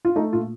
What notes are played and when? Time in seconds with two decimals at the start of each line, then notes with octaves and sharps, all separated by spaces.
0.05 F4
0.16 A3 D#4
0.32 A#2 F4